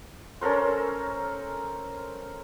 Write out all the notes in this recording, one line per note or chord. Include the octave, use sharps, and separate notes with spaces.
C#4 A4 A#4 C5